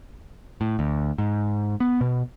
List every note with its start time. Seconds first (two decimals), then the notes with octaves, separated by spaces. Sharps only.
0.61 A2
0.79 D2
1.18 G#2
1.80 B3
2.01 B2